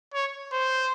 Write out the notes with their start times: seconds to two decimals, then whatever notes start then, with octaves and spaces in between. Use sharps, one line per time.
0.14 C#5
0.53 C5